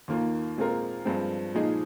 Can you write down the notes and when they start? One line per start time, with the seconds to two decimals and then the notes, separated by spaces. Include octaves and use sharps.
0.08 D#2 D#3 A#3 F4
0.57 A#2 G#3 C4 F4 A#4
1.05 G2 F3 G#3 C4
1.55 A#2 F3 G#3 D#4 G#4